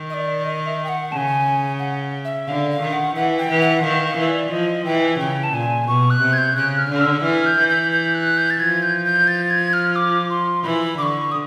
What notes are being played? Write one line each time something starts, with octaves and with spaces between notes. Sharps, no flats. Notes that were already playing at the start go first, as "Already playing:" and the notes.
Already playing: D#3
D#5
D5
D#5
E5
G5
F#5
C#3 G#5 A5
F#5
E5
D3 F5
F5
D#3
F#5
E3 F#5
G5
E3
F#5
D#3 F5
F5
E3
D5
F3 D#5
E3 G5
C#3 G5
A5
A#2 G#5
B2 C#6
F#6
C3
G#6
G6
C#3 F#6
F6
D3
E6
E3 F6
G6
E3
G6
G6
F#6
G6
A6
F3 G#6
G6
G6
A6
G#6
F6
D6
C6
E3 B5
D3 C#6 D6
D#6